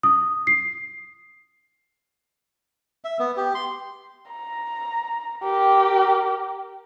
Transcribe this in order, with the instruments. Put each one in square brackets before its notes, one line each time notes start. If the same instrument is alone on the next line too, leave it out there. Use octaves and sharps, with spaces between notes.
[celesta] D#6
C7
[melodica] E5
B3
G4
C6
[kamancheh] A#5
G4 A#4